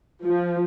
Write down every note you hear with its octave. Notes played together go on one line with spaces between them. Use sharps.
F3